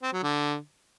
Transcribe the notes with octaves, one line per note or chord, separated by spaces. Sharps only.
C4
F#3
D3